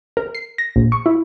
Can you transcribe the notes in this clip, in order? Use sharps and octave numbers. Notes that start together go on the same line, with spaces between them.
A#4
C7
A#6
A#1
C#6
E4